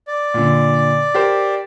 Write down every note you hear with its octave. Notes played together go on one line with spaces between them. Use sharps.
D5
A#2 D3
G4 A#4 C5